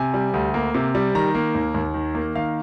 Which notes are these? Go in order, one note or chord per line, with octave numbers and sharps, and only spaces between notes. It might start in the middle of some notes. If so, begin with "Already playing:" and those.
Already playing: C3 G#5
G3
D2
A#3
C3
G3
D#3 A#5
A#3
D#2
D#2
D#3
A#3
D#3 F5